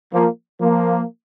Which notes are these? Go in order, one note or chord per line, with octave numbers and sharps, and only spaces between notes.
F3 A#3
F3 A#3